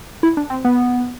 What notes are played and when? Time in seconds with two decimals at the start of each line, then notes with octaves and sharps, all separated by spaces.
0.23 E4
0.37 D4
0.50 C4
0.65 B3